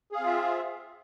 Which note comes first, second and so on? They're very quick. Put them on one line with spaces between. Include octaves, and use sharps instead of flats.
G#4 F5 C4 F4 E5